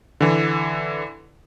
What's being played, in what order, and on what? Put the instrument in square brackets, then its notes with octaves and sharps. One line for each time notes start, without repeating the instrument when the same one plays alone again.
[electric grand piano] D3 E3